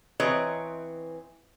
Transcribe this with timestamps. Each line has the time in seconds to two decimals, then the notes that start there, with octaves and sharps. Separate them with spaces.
0.20 E3 C4 B4 C#5 D#5 A#5